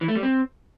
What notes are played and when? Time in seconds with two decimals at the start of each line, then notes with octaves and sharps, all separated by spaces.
0.01 E3
0.08 A3
0.15 G3
0.23 C4